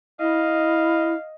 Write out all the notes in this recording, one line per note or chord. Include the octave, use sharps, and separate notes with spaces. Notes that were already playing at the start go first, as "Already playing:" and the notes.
E4 D#5 F5